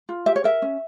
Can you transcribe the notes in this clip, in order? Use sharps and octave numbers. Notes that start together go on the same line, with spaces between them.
F4
G4 E5
C#5
A#4 E5
C#4